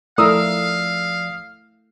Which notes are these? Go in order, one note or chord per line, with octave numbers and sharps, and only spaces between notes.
F3 A3 E4 A#4 D5 F5 D#6 E6